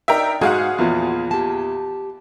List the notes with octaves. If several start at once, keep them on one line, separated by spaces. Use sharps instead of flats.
D4 D#4 A#4 E5 G5 A#5
G#2 F#4 G#4 F5 F#5
E2 A#2 F3
G4 A5